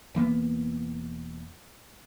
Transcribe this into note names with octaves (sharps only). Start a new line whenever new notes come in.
E1 E3 A#3 B3